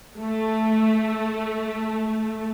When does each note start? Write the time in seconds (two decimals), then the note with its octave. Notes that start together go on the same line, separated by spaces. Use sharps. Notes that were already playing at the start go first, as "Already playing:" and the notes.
0.17 A3